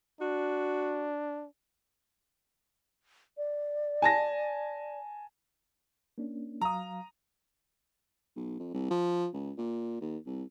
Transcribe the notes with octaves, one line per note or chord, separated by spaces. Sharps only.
D4 F#4
D5
G#5 A5 A#6
A#3 C#4 D4
F#3 F5 A#5 D#6
B1
F2
C2
F3
C#2
A#2
D#2
C2